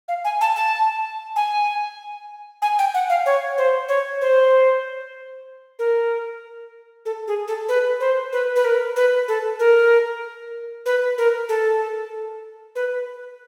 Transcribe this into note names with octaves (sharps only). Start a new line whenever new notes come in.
F5
G#5
A5
A5
G#5
G#5
G5
F#5
F5
C#5
C5
C#5
C5
A#4
A4
G#4
A4
B4
C5
B4
B4
A#4
B4
A4
A#4
B4
A#4
A4
B4